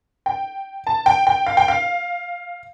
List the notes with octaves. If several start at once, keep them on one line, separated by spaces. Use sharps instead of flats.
G5
A5
G5
G5
F5
G5
F5